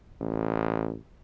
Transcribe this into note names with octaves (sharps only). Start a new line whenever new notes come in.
A1